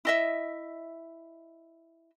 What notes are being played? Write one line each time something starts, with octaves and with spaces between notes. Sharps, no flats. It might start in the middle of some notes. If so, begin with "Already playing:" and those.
E4 D#5 E5